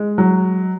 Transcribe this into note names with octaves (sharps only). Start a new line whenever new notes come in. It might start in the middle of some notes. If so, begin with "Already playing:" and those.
Already playing: G#3
F#3